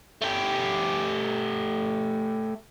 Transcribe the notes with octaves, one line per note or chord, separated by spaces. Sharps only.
A3 G4